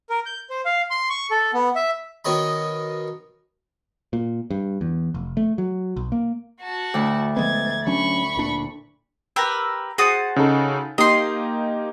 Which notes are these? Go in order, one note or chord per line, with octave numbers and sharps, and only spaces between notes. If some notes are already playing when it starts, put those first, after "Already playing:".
A#4
G6
C5
F5
C6
C#6
A4
B3
E5
B2 D#3 C#5 D#5 B5
A#2
G2
E2
F1
A3
F#3
B1
A#3
F#4 A5
D2 A2
F3 G#3 B3 G#6 A6
F#3 C#4 D4 B5 C#6
D1 A#2 D4
G4 A#4 B4 E6 A#6
F#4 G#4 C5 D#6 A6 C#7
C#3 D#4 A4
A#3 D#4 G4 D#5 C6